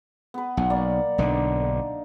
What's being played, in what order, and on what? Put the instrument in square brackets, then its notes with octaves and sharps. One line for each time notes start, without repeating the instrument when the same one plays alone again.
[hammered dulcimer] B3 B4
[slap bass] B1 [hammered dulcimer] F#5
[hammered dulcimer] A#3 D5
[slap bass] B1 D3 [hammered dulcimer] D4 D#4